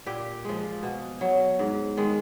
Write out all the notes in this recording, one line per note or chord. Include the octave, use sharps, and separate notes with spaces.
A#2 G4
F3 G#3
B2
F#3
G#2
D#3 G#3